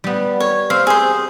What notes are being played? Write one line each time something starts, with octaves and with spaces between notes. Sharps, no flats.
G3 B3
C#5
C4 F5
G#4 C5